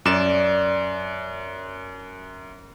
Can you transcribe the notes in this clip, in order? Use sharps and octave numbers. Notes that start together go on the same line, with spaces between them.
F#2 D5 E7